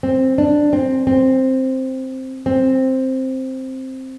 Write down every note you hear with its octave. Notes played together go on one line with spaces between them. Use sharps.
C4
D4
C4
C4
C4